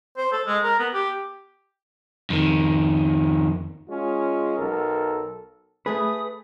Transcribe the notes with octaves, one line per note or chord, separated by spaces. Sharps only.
C5
A4
G#3
A#4
B3
G4
F2 D#3
G#3 C#4 F4
B1 A4 A#4
A3 G#4 B4 D#6